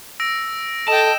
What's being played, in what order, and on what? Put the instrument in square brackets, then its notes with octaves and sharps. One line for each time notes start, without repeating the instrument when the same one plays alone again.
[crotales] E6 A#6 D7
[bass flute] A4 [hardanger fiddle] D#5 G5 [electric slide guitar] A5 [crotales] E7